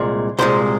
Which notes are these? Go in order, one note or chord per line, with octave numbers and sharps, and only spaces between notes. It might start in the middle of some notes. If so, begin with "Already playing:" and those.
Already playing: C2 A#2 G#3
C2 A#2 G#3 C5